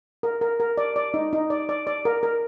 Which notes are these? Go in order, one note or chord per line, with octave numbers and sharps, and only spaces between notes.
A#4
A#4
A#4
D5
D5
D#4
D#4
D5
D5
D5
A#4
A#4